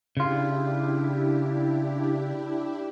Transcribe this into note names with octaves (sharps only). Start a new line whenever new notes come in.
C#3 D4 E4 F4 G4